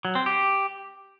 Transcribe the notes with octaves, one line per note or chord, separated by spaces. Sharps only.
F#3
C4
G4